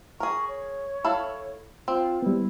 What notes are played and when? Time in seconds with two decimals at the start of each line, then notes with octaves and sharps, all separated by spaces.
0.20 G#4 A#4 C#6
0.48 C#5
1.04 E4 A4 F5
1.88 C4 F4
2.22 G3 B3 E4